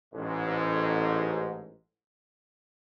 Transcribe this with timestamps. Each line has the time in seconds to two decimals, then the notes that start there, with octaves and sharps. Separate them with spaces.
0.13 A1 G#2